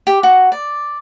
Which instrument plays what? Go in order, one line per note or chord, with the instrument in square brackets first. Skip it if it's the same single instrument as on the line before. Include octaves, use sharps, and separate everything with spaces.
[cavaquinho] G4
F#4
D5